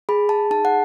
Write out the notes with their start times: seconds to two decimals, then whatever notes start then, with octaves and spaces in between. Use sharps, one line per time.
0.09 G#4 B5
0.29 A5
0.51 D#4 A5
0.65 F#5